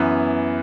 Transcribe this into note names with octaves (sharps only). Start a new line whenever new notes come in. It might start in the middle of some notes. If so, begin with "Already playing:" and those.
Already playing: F#2 E3 B3